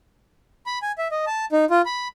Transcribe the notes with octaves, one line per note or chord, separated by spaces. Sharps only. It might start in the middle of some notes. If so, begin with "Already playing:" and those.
B5
G#5
E5
D#5
A5
D#4
F4
B5